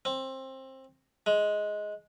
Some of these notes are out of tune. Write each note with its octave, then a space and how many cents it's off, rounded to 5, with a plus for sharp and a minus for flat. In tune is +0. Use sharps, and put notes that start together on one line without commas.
C4 +20
G#3 +10